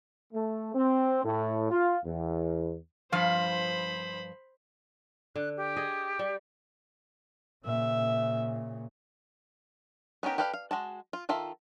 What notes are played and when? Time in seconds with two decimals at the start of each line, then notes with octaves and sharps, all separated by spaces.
0.33 A3
0.74 C4
1.24 A2
1.71 F4
2.04 E2
3.12 G2 F3 C5 F5 B5
5.36 D3 F#6
5.56 G4
5.76 G#4 D#5
6.19 G3
7.65 A#2 C#3 E5
10.23 B3 C#4 D#4 G4 A#4
10.38 G4 A4 B4 D5 F5
10.53 F5
10.71 G#3 F#4 A5
11.13 F4
11.29 D#3 F4 A4 E5